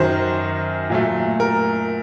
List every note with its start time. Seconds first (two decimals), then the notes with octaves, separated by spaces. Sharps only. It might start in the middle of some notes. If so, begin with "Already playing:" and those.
Already playing: F#2 D#3 F#3 C5
0.90 A#2 F#3 A3
1.40 A#4